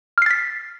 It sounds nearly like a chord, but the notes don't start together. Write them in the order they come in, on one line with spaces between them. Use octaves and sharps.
F6 C7 A6 B6